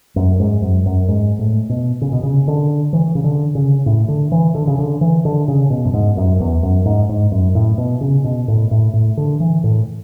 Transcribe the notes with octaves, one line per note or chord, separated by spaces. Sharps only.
F#2
G#2
F#2
F#2
G#2
A2
B2
C#3
B2
C#3
D3
E3
C#3
D3
C#3
A2
D3
E3
D3
C#3
D3
E3
D3
C#3
B2
F#2
G#2
F#2
E2
F#2
G#2
G#2
F#2
A2
B2
C#3
B2
A2
A2
A2
D3
E3
A2